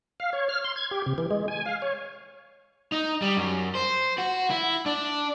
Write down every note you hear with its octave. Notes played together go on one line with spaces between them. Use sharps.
F5
C#5
F6
C6
G#6
G4
C3
E3
G#3
G#5
F5
C#5
D#4
G3
F#2
C5
F#4
E4
D4